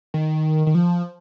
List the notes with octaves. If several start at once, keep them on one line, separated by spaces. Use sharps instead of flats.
D#3
D#3
F3